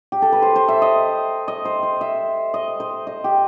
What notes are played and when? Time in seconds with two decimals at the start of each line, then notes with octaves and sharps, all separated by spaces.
0.12 G4
0.22 A4
0.32 B4
0.42 C5
0.56 C5
0.68 E5
0.82 D#5
1.48 D#5
1.65 C5
1.83 C5
2.01 E5
2.54 D#5
2.80 C5
3.07 D#5
3.24 G4